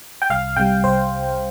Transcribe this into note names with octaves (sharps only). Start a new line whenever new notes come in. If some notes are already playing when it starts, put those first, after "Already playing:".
G5
C2 F5
C3 G3 G5
C2 C5